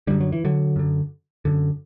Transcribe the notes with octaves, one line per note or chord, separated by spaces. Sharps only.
F#2 D3 G3
F#3
E3
D3 F#3
F#2 D3
F#2 D3